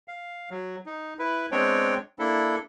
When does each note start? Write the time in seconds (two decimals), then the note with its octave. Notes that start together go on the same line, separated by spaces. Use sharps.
0.08 F5
0.50 F#3
0.86 D#4
1.19 E4 B4
1.52 G#3 B3 C4 D4 C#5 G5
2.19 A#3 D4 E4 A4